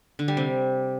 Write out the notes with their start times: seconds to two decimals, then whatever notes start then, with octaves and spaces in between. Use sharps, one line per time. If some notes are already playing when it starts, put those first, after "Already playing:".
0.19 D3
0.28 G3
0.37 C3